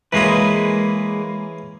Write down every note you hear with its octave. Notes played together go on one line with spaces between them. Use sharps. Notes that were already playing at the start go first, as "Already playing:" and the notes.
E3 G#3 A#3 C#4 G#4 B4